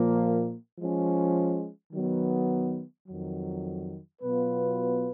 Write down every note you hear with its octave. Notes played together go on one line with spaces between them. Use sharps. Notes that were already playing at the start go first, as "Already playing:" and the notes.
Already playing: A#2 F3 A#3
F3 G#3 C#4
D#3 F#3 B3
F2 D#3 F#3
B2 F#3 B3 F4 B4